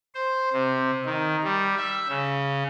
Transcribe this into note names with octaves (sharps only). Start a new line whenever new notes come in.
C5
C3
D#3
G3
E5
C#3